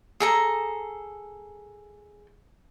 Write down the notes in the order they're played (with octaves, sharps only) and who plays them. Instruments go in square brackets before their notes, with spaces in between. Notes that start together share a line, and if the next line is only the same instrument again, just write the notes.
[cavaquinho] G#4 A4 A#5